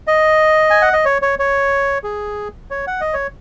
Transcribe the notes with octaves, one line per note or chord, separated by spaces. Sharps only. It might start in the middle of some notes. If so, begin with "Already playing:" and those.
D#5
G#5
F#5
D#5
C#5
C#5
C#5
G#4
C#5
F#5
D#5
C#5